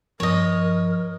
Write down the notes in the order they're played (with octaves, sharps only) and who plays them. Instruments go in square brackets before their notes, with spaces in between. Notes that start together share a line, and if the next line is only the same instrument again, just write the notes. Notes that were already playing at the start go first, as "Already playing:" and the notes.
[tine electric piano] G2 F3 [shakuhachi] A#4 [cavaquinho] C#5 D#5